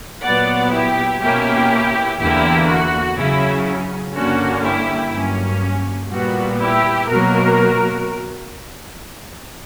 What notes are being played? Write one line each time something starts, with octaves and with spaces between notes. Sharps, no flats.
A#2 F#3 B3 D5 F#5
E4 G4
B2 A#3 C#4 E4 G4
E2 D3 A#3 E4 G4
F#4
C#3 F#3 C#4 E4
G2 D3 A#3 C#4 F#4
E4 G4
G2 F#3 A#3 C#4
A#2 G3 B3 F#4
E4 G4
B2 F#3 A#3 F#4 A#4